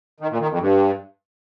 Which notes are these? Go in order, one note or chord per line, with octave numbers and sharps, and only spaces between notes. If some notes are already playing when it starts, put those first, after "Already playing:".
D#3
A#2
D#3
F2
G2